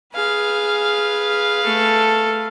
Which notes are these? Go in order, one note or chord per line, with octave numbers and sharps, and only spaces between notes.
G#4 B4 F5
A3 A4